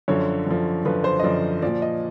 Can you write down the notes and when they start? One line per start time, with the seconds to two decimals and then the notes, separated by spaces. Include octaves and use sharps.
0.08 F#2 D3 F3 C#5
0.47 F#2 D3 F3
0.85 F#2 D3 F3 B4
1.04 C5
1.19 D#5
1.24 F#2 D3 F3 D5
1.62 A#2 F3 D5
1.82 D#5